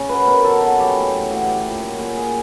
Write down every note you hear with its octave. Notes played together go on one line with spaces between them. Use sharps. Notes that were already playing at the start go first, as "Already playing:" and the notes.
Already playing: C#3 C#4
F#3 B4
B2 A#4
F#3 A4
B2 F#4
F#3 G4
A2
E3
A2 F#4
E3 G4
A#2
F#3
A#2 G#4
F#3 G#4